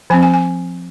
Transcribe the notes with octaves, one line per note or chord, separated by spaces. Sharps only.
F3 C4 G#5
G#5
G#5